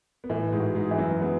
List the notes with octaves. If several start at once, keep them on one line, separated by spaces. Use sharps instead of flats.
B3
A2 E3 A3
G#2 G#3
F#4
G#2 G#3
E3
F#2 F#3
G#3 B3